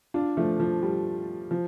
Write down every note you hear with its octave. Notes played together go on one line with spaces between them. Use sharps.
D4 F4
F3 A3
F3
G3
F3